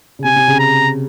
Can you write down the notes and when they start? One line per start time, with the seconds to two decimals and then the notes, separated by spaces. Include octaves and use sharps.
0.19 C#3
0.24 C3 G#5
0.36 C3
0.48 C#3
0.59 A#5